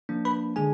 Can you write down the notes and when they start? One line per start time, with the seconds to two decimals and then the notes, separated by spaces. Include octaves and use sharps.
0.09 F3 A#3 D4
0.25 B4 B5
0.56 D3 G#3 D4 G#4 G#5